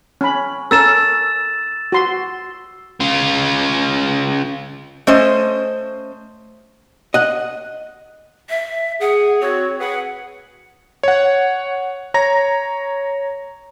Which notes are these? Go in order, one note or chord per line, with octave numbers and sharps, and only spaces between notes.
C#4 B5
C#4 A4 A#4 E6 A6 E7
F#4 C6
C#3 F4
A3 C#4 C5 D#5
D#5 F#5
E5
G#4 F#5
C4 F#4 C#5
G#4 B4 F#5
C#5 F#5
C#5 A#5 A#6